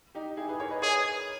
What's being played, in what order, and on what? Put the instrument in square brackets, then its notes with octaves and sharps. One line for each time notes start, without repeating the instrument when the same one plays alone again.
[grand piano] D#4 G4
E4 G#4
G#4 B4
A#4 C#5
B4 D#5
[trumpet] G#4 [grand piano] A#4 C#5